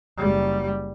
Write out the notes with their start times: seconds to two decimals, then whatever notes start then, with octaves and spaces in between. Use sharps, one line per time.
0.17 F#1 G3